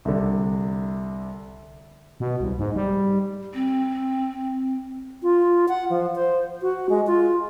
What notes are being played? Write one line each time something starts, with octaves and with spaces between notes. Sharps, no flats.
C2 D3
B2
C2
G#2
G3
C4
F4
F#5
F3
C5
F#4
G#3
F4